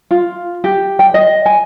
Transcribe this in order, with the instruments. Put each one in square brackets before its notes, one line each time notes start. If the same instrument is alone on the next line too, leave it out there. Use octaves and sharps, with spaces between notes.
[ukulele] F4
G4
G5
D#5
G#5